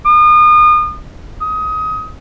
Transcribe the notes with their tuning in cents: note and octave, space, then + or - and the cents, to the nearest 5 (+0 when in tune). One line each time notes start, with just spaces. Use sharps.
D#6 -35
D#6 +20